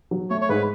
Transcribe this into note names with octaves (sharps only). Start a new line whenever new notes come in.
F#3
A3 C#5
C#5
G#2 B4